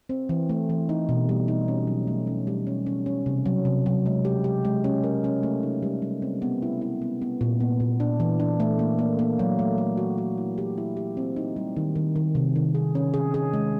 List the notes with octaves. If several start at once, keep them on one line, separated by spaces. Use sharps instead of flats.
C4
E3
A3
E3
D#4
B2
G3
D#4
C#4
F#3
A3
C#4
G3
C#4
C#4
C#4
C3
F#3
C3
F#3
G#3
G4
G4
G#3
C#4
A#4
C#4
A3
D#4
G3
G3
C4
B3
E4
E4
B3
B3
A#2
B3
A#2
D4
E3
D4
A3
A#3
A#3
A#3
F#3
A3
A3
F#4
F#4
E4
G4
E4
G4
C4
D#4
G3
D#3
D#3
D#3
C3
D#3
G#4
C#4
G#4
G#4
G#3